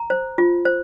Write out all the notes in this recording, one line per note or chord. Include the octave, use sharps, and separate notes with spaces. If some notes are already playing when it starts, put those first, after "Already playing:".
Already playing: A#5
C5
F4
C5